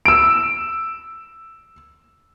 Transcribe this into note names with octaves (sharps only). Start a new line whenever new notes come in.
E6 D7